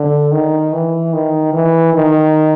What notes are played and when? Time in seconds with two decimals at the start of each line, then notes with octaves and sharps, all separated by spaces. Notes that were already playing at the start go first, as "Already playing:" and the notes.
Already playing: D3
0.32 D#3
0.73 E3
1.13 D#3
1.53 E3
1.94 D#3